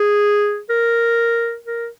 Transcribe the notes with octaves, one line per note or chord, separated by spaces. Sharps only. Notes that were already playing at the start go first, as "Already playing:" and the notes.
Already playing: G#4
A#4
A#4